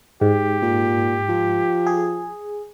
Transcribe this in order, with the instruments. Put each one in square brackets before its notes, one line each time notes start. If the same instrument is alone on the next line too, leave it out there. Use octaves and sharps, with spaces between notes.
[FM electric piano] G#2 [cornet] G4
[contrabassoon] A#2
F3
[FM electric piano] G#4